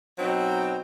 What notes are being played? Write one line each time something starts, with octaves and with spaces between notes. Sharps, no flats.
B2 F#3 C4 D#4